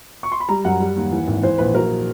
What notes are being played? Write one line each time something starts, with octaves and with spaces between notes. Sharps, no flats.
C#6
C6
B5
G3 A#5
F#2 F#5
G3
D#2
E3
G#1
E3 C5
A#1 B4
F#3 A#4